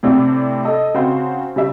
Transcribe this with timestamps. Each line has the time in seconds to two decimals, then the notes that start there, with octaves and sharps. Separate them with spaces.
0.03 A2 C3 C4 D4
0.65 A4 D#5
0.94 C#3 C4 F#4 C5
1.56 C#3 G3 E5